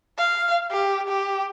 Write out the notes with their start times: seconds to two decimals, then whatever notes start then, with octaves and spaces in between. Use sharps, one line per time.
0.18 F5
0.71 G4
1.08 G4